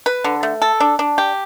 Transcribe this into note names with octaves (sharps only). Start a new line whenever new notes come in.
B4
D3
A3
A4
D4
D4
G4